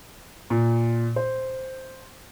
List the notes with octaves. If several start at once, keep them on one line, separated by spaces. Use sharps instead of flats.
A#2
C5